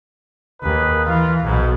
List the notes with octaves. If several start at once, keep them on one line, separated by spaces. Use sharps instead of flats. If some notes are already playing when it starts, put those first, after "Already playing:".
D#2 D#4 G#4 B4
E3 F4
B1 G#2 B2